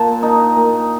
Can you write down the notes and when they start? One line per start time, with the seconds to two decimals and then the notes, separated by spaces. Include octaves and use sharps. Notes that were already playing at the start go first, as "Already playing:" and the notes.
Already playing: A#2 A5
0.23 D#4
0.56 A#2